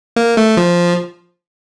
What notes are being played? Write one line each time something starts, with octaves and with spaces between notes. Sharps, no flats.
A#3
A3
F3